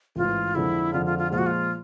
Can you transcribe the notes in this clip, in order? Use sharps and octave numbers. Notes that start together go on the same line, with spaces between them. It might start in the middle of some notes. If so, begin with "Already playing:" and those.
A1 G#2 E3 F4
F2 D3 F3 G#3 E4
F2 D3 F3 G#3 F4
F4
F4
A#2 F3 G#3 F4
F#4
F4